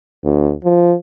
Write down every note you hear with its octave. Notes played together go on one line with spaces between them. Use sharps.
D2
F3